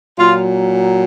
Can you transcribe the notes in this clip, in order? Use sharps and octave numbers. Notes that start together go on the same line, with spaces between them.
A#2 F#3 F4